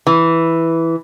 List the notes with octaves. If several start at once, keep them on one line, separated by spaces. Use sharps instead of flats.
E3